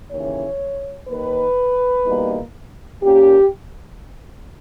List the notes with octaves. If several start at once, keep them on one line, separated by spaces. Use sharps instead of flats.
D#2 C#3 E3 C#5
D#2 D#3 A#3 B4
E2 B2 G3 A#3 D#4
A#2 A#3 C#4 G4